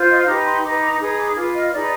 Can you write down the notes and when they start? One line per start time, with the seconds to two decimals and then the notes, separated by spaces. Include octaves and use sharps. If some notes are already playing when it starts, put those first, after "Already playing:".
Already playing: F4 C5
0.10 D#5
0.18 F5
0.27 D#4 G4 B4 D6
0.46 C6
0.63 D#4 B4 D6
0.81 D6
1.00 D#4 G#4 B4 D#6
1.18 D6
1.36 F4 B4 D6
1.54 D#5
1.72 D#4 G#4 B4 D5